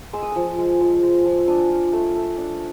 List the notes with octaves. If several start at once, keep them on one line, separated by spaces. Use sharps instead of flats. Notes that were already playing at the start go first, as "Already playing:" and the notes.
G#3 E6
D#6
F3 E6
G#3
F3
G#3
F3
E6
D4 D#6
F4
A3
A3
D4